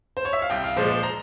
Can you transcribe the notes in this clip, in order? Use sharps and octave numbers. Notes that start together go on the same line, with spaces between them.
C5
C#5
E5
F5
C2 G5
F5
A#2 F3 G#3 C5
C5
A#5